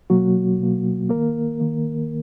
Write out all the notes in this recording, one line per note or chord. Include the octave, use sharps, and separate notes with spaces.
B2 F#3 A#3 F#4
B2 A#3
D#3 A#3 A#4
D#3 A#3